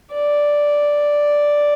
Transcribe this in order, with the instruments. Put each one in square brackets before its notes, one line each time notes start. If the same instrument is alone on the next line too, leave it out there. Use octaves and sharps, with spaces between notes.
[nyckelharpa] D5